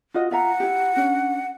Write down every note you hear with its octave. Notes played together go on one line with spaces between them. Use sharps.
F4 F#4 D#5
F4 E5 F#5 A#5
E4 G4
C#4 D4